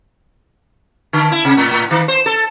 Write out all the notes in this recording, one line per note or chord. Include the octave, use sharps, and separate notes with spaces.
D3
E4
C3
A2
A2
D#3
C5
A4